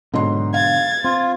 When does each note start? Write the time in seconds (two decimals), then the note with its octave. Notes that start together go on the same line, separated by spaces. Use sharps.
0.14 G#2 B2 D3 F#3 C6
0.54 F5 G#6 A6
1.04 C4 F4